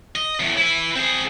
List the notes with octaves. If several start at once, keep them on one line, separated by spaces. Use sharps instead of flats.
D#5
E2 A2
E4 B4
C4 G#4